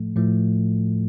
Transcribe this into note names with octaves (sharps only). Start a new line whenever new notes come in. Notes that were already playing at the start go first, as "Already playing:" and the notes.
Already playing: A2 F3 A3
A2 F3 A3